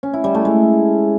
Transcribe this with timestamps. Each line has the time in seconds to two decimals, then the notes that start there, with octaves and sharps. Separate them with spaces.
0.03 C#4
0.13 E4
0.24 G3
0.35 A3
0.45 G#3